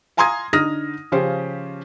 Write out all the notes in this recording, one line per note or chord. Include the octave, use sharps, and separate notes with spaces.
F5 G#5 A#5 C6 D#6 G#6
D3 D#4 D#6 F6 A#6
C#3 F3 C#4 G4 C5